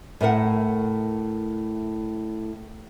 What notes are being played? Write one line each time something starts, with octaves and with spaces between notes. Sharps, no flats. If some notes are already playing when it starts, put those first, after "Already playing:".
A2 A3 A#4 F#5